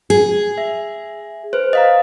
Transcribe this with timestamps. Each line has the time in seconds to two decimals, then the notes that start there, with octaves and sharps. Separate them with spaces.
0.10 G#4
0.58 E5
1.53 B4 C5
1.73 D#5 F5 A#5